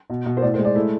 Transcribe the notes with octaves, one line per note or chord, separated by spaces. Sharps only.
B2
B2
C5
A2 D5
C5
G#3
D5
A3 E4